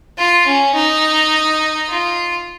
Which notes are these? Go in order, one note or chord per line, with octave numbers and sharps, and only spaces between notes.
F4
C#4
D#4
F4